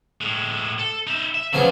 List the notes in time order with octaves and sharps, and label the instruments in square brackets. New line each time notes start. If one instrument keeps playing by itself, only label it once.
[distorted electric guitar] A2 G#3
A4
D#4 E5
E5
[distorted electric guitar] A#2 [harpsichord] C#3 F3 B3